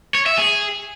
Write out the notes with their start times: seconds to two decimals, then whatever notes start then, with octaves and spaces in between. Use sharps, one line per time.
0.15 C#5
0.26 E5
0.38 G#4